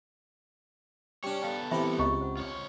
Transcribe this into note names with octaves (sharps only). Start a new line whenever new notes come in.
G3 C#4 D4 C#5 G5
B3 A4 F5 G5
C3 E3 G4 E5 B5
C#2 D#5 A#5 C#6
C5 F#5
F4 C#5